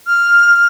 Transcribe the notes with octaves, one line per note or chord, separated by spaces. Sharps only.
F6